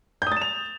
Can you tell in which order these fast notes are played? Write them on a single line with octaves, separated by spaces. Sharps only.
G6 D#6 A6 E7 F7